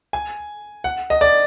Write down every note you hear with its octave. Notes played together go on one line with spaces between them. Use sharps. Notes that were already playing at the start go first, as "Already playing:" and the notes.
G#5
F#5
D#5
D5